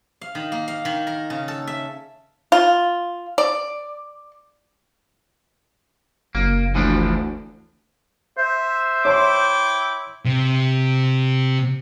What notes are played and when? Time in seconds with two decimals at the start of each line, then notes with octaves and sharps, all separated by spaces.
0.21 F5
0.35 D#3
0.52 A#3
0.68 F5
0.85 D#3
1.07 A#4
1.30 C#3
1.48 A4
1.67 E5
2.52 F4
3.38 D5
6.35 F#1 A#3
6.75 D2 E3 F3 D4
8.38 C5 E5
9.05 E4 C#5 G5 C6 D6
10.25 C3